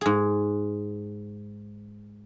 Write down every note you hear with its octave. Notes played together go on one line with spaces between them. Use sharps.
G#2 G#4